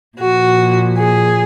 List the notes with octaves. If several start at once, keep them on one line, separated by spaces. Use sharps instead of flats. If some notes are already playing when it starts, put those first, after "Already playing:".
A#2 F3 F#4
G#4